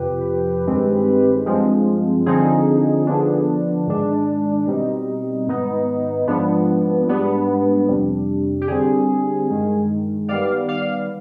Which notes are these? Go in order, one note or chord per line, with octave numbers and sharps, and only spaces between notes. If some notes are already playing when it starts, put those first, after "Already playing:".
Already playing: F2 C3 F3 G4 B4
G2 D#3 G#3 C4
G2 F3 G#3 C4
D3 F3 C4 D#4 G#4
D3 F3 B3 D4
G#2 D#3 G#3 D4
B2 G3 C4 D#4
G#2 D#3 B3 D#4
G#2 F3 B3 D4
G#2 G3 B3 D4
F2 C3 G3 D4
G4
D3 G3 C4 G#4
G2 D#3 G#3
D#3 G3 B3 D5 F5
D5 F5